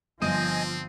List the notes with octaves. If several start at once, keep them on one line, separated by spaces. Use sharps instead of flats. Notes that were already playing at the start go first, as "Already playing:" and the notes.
G1 F3 C4 D#5 G#5 D#6 G6 D#7